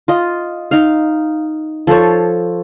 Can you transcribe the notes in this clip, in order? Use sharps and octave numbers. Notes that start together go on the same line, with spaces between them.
F4 D#5
D#4 F5
F3 A4 C5 C#5